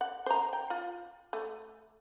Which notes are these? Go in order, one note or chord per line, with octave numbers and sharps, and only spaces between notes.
F#5
C5 A#5
G5
F4
A3